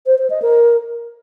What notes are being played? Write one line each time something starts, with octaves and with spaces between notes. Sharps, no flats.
C5
C5
D#5
A#4